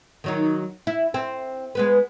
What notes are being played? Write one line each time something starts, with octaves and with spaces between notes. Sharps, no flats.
D#3 F#3 D#4
E4
C4
G#3 B3 B4